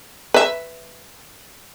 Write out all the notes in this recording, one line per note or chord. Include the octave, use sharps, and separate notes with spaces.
B4 E5